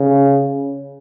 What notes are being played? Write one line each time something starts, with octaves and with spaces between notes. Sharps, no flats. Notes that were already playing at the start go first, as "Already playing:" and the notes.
Already playing: C#3